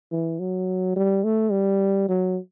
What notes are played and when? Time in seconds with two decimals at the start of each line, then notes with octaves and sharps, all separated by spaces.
0.12 E3
0.39 F#3
0.96 G3
1.24 A3
1.51 G3
2.08 F#3